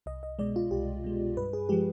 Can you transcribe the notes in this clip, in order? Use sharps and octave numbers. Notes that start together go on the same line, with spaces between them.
C2 D#5
D#5
B2 G#3 D5
F4
C2 G4
B2 G#3
G2 B4
G#4
F3 G#3 G4